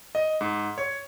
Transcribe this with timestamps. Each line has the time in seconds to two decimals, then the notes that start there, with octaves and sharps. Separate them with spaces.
0.15 D#5
0.41 G#2
0.78 C#5